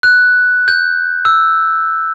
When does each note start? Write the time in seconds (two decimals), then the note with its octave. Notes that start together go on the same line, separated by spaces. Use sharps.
0.03 F#6
0.68 G6
1.25 E6